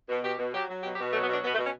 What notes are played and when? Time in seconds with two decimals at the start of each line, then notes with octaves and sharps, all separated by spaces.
0.09 B2
0.23 B2 G4
0.39 B2
0.53 F#3 G4
0.68 F#3
0.83 B2 G4
0.94 G4
0.99 B2
1.13 F#3 A3
1.23 B3
1.28 B2 D4
1.44 B2 B3
1.54 A3
1.58 B2
1.64 C#4